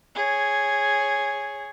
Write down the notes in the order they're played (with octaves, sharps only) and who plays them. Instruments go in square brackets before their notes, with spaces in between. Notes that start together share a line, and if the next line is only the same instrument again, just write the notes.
[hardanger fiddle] G#4 C#5